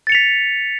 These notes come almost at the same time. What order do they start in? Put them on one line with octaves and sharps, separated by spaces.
A6 C#7 F7 B6